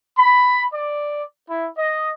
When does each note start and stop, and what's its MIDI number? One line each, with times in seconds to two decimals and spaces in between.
0.16 0.62 83
0.72 1.22 74
1.48 1.66 64
1.77 2.09 75